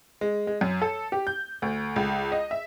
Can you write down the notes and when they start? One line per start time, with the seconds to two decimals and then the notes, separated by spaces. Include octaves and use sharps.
0.21 G#3
0.47 G#3
0.61 F#2
0.82 A4
1.12 G4
1.27 G6
1.62 D2
1.96 C#2
2.32 D#5
2.51 E5